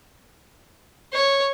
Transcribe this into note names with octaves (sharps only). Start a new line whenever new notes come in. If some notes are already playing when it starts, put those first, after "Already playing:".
C#5